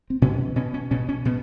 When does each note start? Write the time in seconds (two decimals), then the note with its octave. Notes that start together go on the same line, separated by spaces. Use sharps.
0.10 C4
0.22 B2 C#4
0.56 B2 C#4
0.74 C#4
0.91 B2 C#4
1.09 C#4
1.25 B2 B3